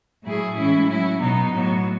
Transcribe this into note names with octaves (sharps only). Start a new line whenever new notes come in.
A2 F#3 A3 E4 G#4
A2 E3 G#3 C#4 E4
F#3 C#4 E4
B2 F#3 B3 D#4
A2 F#3 B3